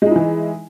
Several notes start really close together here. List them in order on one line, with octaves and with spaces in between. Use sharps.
G#3 D#4 E4 E3